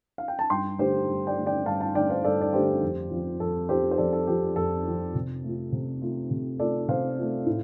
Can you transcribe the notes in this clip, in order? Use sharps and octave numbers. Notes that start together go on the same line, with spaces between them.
F5
G5
A5
G2 G5 C6
D3 A3 D4 G4 C5
G2
D5 G5
D3 A3 D4
D5 G5
G2 F5 A5
F5 A5
D3 A3 D4 D5 G5
C5 F5
G2 A4 D5
D5
D3 A3 D4 G4 C5
F2
F3 C4 F4
F2 A4
F3 C4 F4 G4 C5
C5
F2 A4 D5
A4
F3 C4 F4 G4
F2 A4
F3 C4 F4
C3
A3 F4
C3
A3 F4
C3
A3 F4 A4 D5
C3 C5 F5
A3 F4
A2